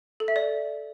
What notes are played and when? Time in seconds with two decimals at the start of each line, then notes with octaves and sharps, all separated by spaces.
0.20 A4
0.28 E5
0.36 D5